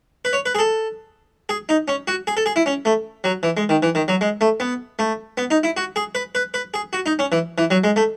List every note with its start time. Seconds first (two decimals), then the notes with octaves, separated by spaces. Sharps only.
0.25 B4
0.33 C#5
0.46 B4
0.55 G#4
0.59 A4
1.49 G#4
1.69 D#4
1.88 C#4
2.08 F#4
2.27 G#4
2.37 A4
2.46 G#4
2.56 E4
2.66 C#4
2.85 A3
3.24 F#3
3.43 E3
3.57 G#3
3.69 D#3
3.83 E3
3.95 D#3
4.08 F#3
4.21 G#3
4.41 A3
4.60 B3
4.99 A3
5.38 B3
5.51 D#4
5.63 E4
5.77 F#4
5.96 G#4
6.15 B4
6.35 B4
6.54 B4
6.74 G#4
6.93 F#4
7.06 D#4
7.19 C#4
7.32 E3
7.58 E3
7.71 F#3
7.84 G#3
7.96 A3